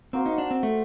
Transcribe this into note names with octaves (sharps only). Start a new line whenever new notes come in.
A#3 C4 F#4 C5
D#4
D4
C4
A3